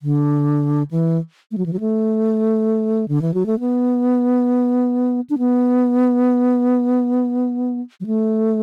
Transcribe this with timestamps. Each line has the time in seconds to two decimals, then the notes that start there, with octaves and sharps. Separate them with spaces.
0.02 D3
0.91 E3
1.51 A3
1.58 F#3
1.66 E3
1.73 F#3
1.80 A3
3.08 D3
3.22 E3
3.34 F#3
3.46 A3
3.60 B3
5.30 D4
5.38 B3
8.00 F#3
8.06 A3